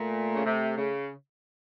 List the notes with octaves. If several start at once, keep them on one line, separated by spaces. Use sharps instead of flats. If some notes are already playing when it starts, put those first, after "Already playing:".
Already playing: A#2 A3
C#3
C3
C#3